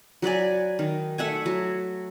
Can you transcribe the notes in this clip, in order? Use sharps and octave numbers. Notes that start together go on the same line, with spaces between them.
F#3 B4 D5 G#5
D#3
A3 E5 F#5 G#5
F#3